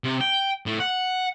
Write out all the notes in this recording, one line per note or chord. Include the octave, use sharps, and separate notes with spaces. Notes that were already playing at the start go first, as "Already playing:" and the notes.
C3
G5
A2
F#5